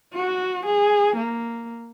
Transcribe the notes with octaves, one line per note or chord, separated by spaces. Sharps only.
F#4
G#4
A#3